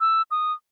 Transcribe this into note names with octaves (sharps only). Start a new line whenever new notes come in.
E6
D#6